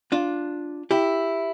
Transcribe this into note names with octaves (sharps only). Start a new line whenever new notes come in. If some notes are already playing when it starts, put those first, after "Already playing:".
D4 F4
E4 G4